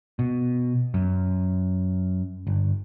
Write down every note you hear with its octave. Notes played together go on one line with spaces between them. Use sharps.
B2
F#2
G1